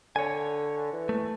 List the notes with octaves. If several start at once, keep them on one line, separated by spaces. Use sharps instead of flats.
D3 C#5 G#5
E3
A3